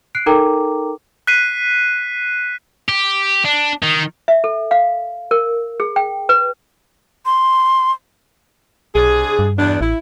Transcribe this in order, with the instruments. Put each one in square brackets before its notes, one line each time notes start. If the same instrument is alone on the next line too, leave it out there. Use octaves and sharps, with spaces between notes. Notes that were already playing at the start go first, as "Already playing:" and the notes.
[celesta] F#6 C7 D7
D#4 A4 A#4 G5 A#5 D6
[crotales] F#6 B6 C7 D#7
[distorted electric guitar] G4
D4
D#3
[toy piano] E5
A4
F5
A#4
G#4
G5
B4
[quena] C6
[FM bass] B1 [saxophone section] C3 D4 G#4
[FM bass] G2
[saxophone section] E2 B2 D4
[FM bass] A1 [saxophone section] E4